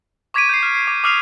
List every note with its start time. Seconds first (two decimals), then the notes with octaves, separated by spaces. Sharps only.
0.34 C#6 D6 G#6 B6 D7 D#7
0.49 G6 C7
0.63 F6
0.75 C7
0.87 D6
1.04 D6 D#6 F6 C7 D#7 F7